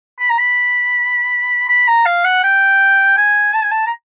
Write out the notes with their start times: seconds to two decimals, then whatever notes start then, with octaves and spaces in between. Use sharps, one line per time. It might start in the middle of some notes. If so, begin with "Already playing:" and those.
0.20 B5
0.30 A#5
0.38 B5
1.69 B5
1.88 A#5
2.06 F5
2.25 F#5
2.43 G5
3.17 G#5
3.54 A5
3.63 G#5
3.71 A5
3.86 A#5